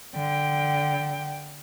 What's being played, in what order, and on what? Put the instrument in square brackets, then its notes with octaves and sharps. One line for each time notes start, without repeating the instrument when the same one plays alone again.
[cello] D3 G5